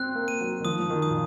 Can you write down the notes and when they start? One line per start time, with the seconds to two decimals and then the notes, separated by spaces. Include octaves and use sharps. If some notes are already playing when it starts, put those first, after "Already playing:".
Already playing: C4 F#6
0.15 A#3
0.28 D#7
0.41 F#3
0.60 D#3
0.65 F3 D#6
0.80 F3
0.90 D#3
1.02 D#6
1.10 A#2